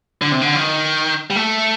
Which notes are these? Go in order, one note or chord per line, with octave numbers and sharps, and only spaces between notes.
D3
C3
D3
F3
D#3
G3
A3